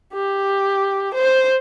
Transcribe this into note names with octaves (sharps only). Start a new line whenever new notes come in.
G4
C5